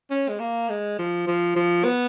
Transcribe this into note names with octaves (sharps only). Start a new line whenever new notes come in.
C#4
G#3
A#3
G#3
F3
F3
F3
B3